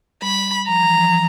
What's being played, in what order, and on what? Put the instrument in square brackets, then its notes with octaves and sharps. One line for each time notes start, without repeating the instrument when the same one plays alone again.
[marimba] G3 [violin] B5
[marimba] F3 [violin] A#5
[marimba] E3
F3
E3